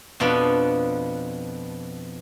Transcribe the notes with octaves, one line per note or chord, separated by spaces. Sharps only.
F2 B2 F3 B3 D4